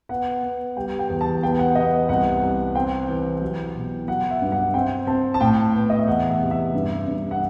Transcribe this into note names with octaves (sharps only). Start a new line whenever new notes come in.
B3 F#5
B3
G3 G5
G5
E2
A5
B3 G5
F#5
B3 D#5
C2 F#5
C2
C4 G5
E3
F#3
B2
F#3 F#5
E5
G2
F#5
C4 G5
C4 A5
A5
A2 G5
B3
D#5
E5
E2 F#5
E5
C3
E5
G2
G2
F#5